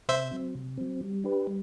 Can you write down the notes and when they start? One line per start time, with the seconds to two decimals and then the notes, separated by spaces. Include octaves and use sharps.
0.08 C3 C5 E5
0.31 F#3 C4
0.55 C3
0.78 F#3 C4
1.01 G3
1.24 D4 G4 B4
1.47 G3